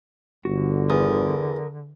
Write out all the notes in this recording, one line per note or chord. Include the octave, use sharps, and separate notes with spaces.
G1 D3 F#4
E2 A#4 D#6